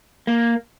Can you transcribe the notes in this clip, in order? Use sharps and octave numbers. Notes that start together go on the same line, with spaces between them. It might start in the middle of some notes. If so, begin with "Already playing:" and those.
A#3